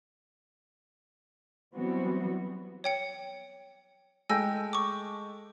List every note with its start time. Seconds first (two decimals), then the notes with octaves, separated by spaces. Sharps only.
1.74 E3 F#3 G3 B3 C4 F#4
2.84 C#5 G5 C#7
4.29 G#3 A3 G5 G#5 E6 A#6
4.73 C#6 D6